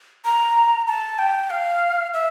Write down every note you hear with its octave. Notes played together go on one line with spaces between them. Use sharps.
A#5
A5
G5
F5
E5